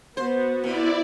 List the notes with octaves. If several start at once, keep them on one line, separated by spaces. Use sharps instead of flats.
B3 F#4 C5
C3 E4 D5